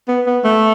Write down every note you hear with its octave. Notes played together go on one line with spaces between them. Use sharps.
B3
B3
A3